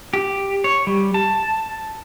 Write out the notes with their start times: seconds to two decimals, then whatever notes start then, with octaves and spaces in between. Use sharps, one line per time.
0.13 G4
0.64 C#5
0.87 G3
1.14 A5